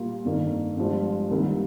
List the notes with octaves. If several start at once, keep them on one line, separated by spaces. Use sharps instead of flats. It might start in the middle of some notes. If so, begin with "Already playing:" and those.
Already playing: A#2 G3 A#3 F4
G1 F2 D#3 A#3
G1 G2 F3 G#3
C2 C3 D#3 G3 A#3